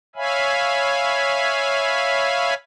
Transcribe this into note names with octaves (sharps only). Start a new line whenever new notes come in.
C#5 E5 F5 G#5 B5